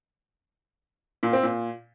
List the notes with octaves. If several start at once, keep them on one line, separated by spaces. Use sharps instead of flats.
A#2
C4
A#2